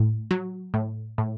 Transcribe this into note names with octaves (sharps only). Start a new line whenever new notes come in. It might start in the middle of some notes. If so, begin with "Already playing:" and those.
Already playing: A2
F#3
A2
A2